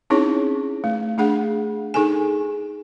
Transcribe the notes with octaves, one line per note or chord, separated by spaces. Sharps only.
C4 C#4 D#4 E4 G#4 C#5
A3
A3 D4 G#4 F#5
D#4 G#4 A4 G#5